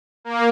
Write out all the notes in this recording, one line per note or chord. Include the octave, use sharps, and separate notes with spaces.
A#3